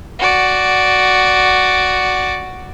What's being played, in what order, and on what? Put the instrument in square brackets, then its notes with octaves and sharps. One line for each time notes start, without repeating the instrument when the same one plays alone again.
[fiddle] F#4 D5